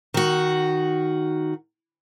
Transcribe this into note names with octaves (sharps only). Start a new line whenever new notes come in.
D#3 F#4